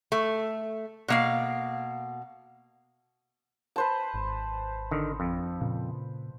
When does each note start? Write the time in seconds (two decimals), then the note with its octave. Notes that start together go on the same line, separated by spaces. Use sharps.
0.12 A3
1.08 B2 A#3 F5
3.76 B4 C5 A5
4.14 G#1
4.91 D3 D#3
5.20 F2
5.61 A#2 C#3